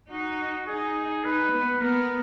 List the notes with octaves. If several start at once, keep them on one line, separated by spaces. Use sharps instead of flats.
D#4 F#4
D#4 G#4
D#4 B4
B3
B3 A#4